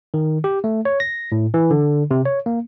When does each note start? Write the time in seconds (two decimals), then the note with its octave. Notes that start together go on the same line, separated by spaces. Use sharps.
0.14 D#3
0.44 G4
0.64 A3
0.85 C#5
1.00 A#6
1.32 A2
1.54 E3
1.71 D3
2.11 C3
2.25 C#5
2.46 A#3